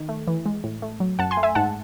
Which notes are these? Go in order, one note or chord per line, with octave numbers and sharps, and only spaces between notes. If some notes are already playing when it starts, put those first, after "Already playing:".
Already playing: D#3
A3
E3
G#3
A2
A3
F#3
F#2 F#5 A5
G#5 C6
A3
E5 G#5
G#2 F#5 A5